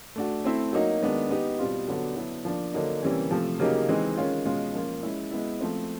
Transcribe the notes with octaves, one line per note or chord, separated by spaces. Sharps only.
A3 D4 F#4
A3 C4 E4
F#3 A#3 D#4 F#4
D#3 G#3 B3 D4
B3 D#4 G4
B2 G3 C4 F4
D3 F#3 B3 D4 F#4
D3 F#3 B3 E4 A4
F3 A#3 D4
D3 F#3 A#3 D#4
C3 E3 G3 A#3 C#4
C3 F3 A3
C#3 F#3 A#3 D#4 G4
E3 G#3 C4 D#4
D#3 G#3 C#4 F4
B2 G#3 C#4 F4
F3 A#3 C#4 F4
G#3 C#4 E4
G#3 B3 E4
F3 A3 C4